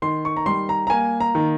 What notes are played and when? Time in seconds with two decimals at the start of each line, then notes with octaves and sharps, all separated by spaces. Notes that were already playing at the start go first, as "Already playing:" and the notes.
0.02 D#3 C6
0.25 C#6
0.37 A#5
0.46 G3 C6
0.69 A#5
0.87 A#5
0.90 A#3 G#5
1.20 A#5
1.35 D#3